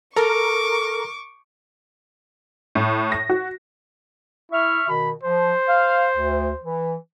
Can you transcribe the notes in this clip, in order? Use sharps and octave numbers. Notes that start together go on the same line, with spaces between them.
A4 A#4 C#6 D6
A2
A#6
F#4
E4 E5 C#6 F6
B2 D#3 B5
F3 C5
F5
D2
E3